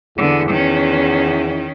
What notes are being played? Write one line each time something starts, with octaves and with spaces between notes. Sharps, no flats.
E2 D3 B3
D#3 C#4